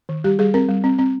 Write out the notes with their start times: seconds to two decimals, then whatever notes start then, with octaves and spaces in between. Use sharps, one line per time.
0.09 D#3
0.24 G3 G4
0.39 G3 G#4
0.54 C4 A#4
0.69 G3
0.84 C4
0.99 C4